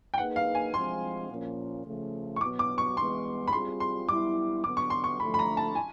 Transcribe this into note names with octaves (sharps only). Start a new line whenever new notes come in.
G5
A#3 D#4 G#4 B4 F#5
F5
G#5
F3 G#3 C4 C6
A#2 F3 A#3 C#4
C#3 F3 A3
C#6
B2 F#3 B3 D6
D6
C#6
E3 G#3 B3 C6
B5
G3 C4 F4 G#4 C6
C6
G3 B3 E4 D6
D3 F#3 B3 D6
C#6
C6
C#6
D3 F3 A3 B5
B5
A#5
A5
G#5